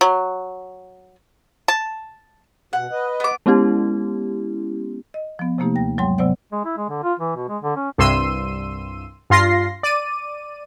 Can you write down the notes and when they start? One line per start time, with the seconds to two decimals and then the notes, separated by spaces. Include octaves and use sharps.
0.01 F#3
1.68 A5
2.73 B2 F#5
2.91 B4 D#5
3.20 B3 D6
3.46 G#3 B3 C#4 E4 G4
5.14 D#5
5.39 F3 B3
5.58 C3 F3 A3 A#3 D#4 G4
5.75 D#2 G5 A#6
5.98 G2 F#3 G#3 C#5 G5 C6
6.18 C3 F#3 B3 C5 D5 F#5
6.52 G#3
6.65 E4
6.77 G#3
6.89 D3
7.03 F4
7.19 E3
7.36 B2
7.49 G#3
7.63 D3
7.76 C#4
7.98 C2 G2 C6 E6 D#7
9.30 G2 F4 C6 A#6 C7
9.83 D5 D#7